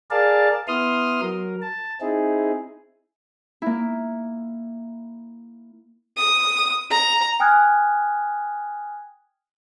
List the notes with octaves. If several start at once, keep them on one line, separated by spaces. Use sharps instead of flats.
G#4 A#4 D5 F5 A5
B3 E4 C6 D#6 F6
F#3 A#4
A5
C4 D#4 E4 G#4
A#3 E4
D#6
A#5
G5 G#5 D#6 F6 F#6 G#6